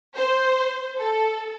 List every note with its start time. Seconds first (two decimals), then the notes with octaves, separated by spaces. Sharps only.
0.15 C5
0.98 A4